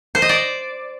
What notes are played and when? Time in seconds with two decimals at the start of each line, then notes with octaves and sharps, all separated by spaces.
0.15 C5
0.22 D#5
0.29 D5